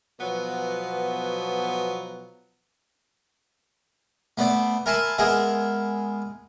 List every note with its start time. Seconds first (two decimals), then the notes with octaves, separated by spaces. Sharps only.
0.20 B2 F3 F#3 B3
4.37 A3 B3 C5 D5
4.86 A#4 E5 G#5 A5 B5 C6
5.18 G#3 B3 G#4 A#4 E5